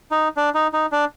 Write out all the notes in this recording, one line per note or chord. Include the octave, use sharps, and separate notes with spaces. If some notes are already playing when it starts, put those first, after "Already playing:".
D#4
D4
D#4
D#4
D4